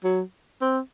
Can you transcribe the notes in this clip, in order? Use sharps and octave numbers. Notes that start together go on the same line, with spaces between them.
F#3
C4